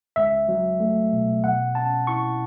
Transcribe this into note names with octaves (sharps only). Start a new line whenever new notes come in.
C#2 E5
F#3
A3
B2
B2 F#5
C#4 A5
E4 C#6